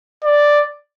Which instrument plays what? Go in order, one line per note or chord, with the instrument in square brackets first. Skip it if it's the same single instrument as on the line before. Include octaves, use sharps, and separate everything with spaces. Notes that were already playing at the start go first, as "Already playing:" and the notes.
[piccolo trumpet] D5